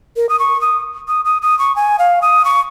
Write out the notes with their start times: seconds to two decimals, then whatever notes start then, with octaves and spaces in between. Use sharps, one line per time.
0.16 A#4
0.29 D#6
0.39 C#6
0.61 D#6
1.08 D#6
1.25 D#6
1.42 D#6
1.59 C#6
1.76 G#5
1.99 F5
2.22 D#6
2.45 C#6